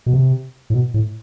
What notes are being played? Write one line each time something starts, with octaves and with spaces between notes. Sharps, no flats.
B2
C3
A2
B2
A2